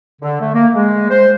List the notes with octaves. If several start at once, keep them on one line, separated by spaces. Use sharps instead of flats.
D3
A3
A#3
G#3
C5